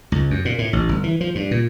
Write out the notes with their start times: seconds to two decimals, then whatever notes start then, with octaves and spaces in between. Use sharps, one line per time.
0.12 C#2
0.31 F#2
0.45 A#2
0.59 A2
0.73 A1
0.89 G1
1.04 E3
1.21 F3
1.35 G2
1.51 A#2